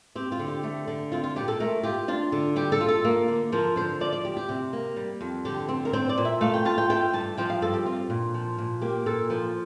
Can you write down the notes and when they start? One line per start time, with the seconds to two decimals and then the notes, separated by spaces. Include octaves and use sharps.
0.15 C4 G4
0.32 F4
0.39 D3
0.48 G4
0.63 A3 G4
0.87 D3
1.12 C4 F4
1.24 F4
1.36 A#2 G4
1.48 A4
1.60 A3 A#4
1.83 F4 G4
2.08 D4 F4
2.32 D3
2.56 G3 G4
2.72 A4
2.81 F4
2.89 A4
3.05 A#3
3.28 D3
3.52 F3 A#4
3.76 D3 C5
4.01 F3 D5
4.12 D5
4.25 D2 G4
4.37 G4
4.49 C3
4.73 A#3
4.96 G3
5.21 F2
5.45 D3 G4
5.69 C4
5.85 A#4
5.93 C4 C5
6.09 D5
6.18 A#2
6.25 E5
6.41 A3 F5
6.54 G5
6.65 F4 A5
6.78 G5
6.90 A3 G5
7.13 G2 A5
7.38 F3 G5
7.50 F5
7.62 G2 A4
7.74 G4
7.86 C4 F4
8.10 A#2
8.34 F3
8.58 A#2
8.81 A#3 G4
9.06 A#2 A4
9.30 F3